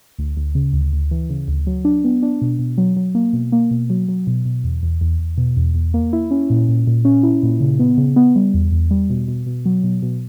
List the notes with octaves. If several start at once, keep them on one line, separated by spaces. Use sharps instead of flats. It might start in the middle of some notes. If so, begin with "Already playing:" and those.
D2
D2
C#3
D2
D2
E3
C#3
D2
F#3
D4
B3
D4
B2
B2
F#3
F#3
A#3
B2
A#3
B2
F#3
F#3
B2
B2
E2
E2
E2
E2
B2
E2
E2
A#3
E4
C#4
A#2
A#2
A#2
C#4
E4
A#2
C#3
B3
C#3
B3
G3
E2
E2
G3
B2
B2
B2
F#3
B2
B2